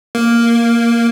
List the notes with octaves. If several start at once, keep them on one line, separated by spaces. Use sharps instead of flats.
A#3